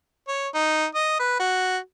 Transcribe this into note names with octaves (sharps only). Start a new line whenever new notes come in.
C#5
D#4
D#5
B4
F#4